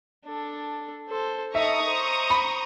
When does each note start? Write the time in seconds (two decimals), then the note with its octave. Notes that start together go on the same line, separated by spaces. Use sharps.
0.25 D4 A4
1.09 A4 C5
1.55 D#4 A4 E5 A#5 C#6 D#6
1.88 C5
2.30 B5